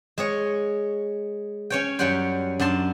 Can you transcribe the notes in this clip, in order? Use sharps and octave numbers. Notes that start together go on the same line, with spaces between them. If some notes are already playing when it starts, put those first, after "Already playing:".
G#3 G#4 C#5
C#4 C#5 G5
F#2 G3 C#4 F#5 G5 C6
F#2 D4 A5 C6